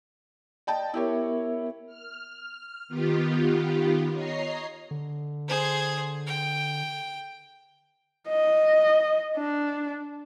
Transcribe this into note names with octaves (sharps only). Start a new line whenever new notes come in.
D5 D#5 G5 A5
B3 E4 G4 A#4 C#5 E5
F6
D#3 B3 F4 G4
C#5 D#5 A#5 C7
D3
G#4 C5
G5
D#5
D4